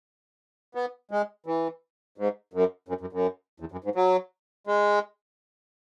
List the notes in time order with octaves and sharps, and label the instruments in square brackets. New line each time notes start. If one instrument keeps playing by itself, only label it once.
[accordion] B3
G#3
E3
G#2
F#2
F#2
F#2
F#2
E2
F#2
G#2
F#3
G#3